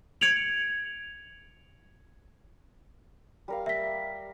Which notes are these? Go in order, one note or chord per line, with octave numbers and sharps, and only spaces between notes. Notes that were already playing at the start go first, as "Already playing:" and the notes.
G#6 C#7 D7 F7 F#7
G3 A#4 F5
E5 B6